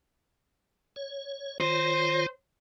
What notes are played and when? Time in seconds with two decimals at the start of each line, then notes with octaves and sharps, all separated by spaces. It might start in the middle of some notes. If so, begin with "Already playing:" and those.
0.96 C#5
1.60 D#3 F4 C5 C#5